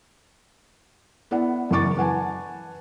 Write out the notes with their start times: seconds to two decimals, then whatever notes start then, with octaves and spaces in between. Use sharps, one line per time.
1.31 B3 E4 D5 F#5
1.71 F#2 C#3 E3 C#6 D6 A6
1.97 B4 F#5 G#5 A5